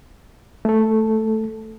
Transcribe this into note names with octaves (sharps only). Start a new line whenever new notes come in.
A3 A4